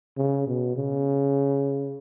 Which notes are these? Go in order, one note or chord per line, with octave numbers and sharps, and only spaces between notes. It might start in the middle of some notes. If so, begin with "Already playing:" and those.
C#3
B2
C#3